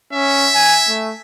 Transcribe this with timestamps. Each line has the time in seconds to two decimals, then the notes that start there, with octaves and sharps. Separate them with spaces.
0.13 C#4 E5
0.55 G#5
0.88 A3